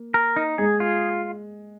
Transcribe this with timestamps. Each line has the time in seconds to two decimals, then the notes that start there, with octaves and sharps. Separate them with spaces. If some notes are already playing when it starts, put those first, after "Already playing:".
Already playing: A#3
0.14 A#4
0.36 D#4
0.58 G#3 G#4
0.80 F4